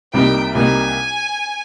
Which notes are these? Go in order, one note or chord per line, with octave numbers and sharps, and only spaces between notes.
C2 C3 G3 A#3 D#4 G5
C2 C3 G3 A#3 D#4 G#5